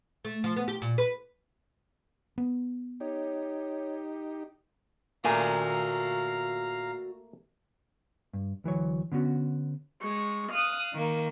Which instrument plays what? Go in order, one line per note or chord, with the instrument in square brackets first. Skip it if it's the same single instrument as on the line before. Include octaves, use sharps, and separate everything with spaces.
[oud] A3
F3
B3
G4
A#2
B4
[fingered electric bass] B3
[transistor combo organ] D#4 G4 [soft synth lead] C#5
[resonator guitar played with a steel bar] A#2 G#5 [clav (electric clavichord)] A3 A#3 [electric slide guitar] F#4 D5 [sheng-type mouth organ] F5 A#5
[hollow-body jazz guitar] G2
D2 E3 F#3 C#5
D3 B3 C#4 F#4
[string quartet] G#3 C#6
F5 D#6 F#6
D#3 A#3